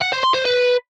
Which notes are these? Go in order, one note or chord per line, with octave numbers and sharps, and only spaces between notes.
F#5
C5
C6
C5
B4